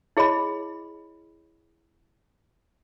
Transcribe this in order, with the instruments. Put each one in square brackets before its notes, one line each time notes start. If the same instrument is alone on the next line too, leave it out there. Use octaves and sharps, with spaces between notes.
[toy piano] E4 G#4 C#5 D#5 B5